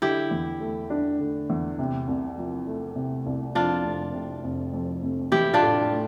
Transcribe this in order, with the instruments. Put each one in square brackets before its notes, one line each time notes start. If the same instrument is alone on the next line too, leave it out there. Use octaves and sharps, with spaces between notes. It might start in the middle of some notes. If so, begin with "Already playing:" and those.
[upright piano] D3 [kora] E4 G4
[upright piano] E2
A3
D4
D3
E2
C3
C2
F3
A3
C3
C2
[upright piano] F2 [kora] D4 F4
[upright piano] F1
C3
F1
F2
F1
[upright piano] E3 [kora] E4 G4
[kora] D4 F4
[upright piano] A2
A3